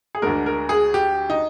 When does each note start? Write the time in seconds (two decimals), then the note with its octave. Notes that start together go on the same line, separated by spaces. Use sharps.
0.15 G#4
0.22 D2 D3 G#3 D4 A#4
0.46 A#4
0.69 G#4
0.94 G4
1.30 D#4